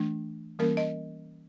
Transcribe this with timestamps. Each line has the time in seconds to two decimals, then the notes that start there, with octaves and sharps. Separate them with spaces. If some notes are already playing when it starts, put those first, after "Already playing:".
Already playing: E3 A3 D4
0.59 E3 G3 A#3 C#4 A#4
0.77 D#5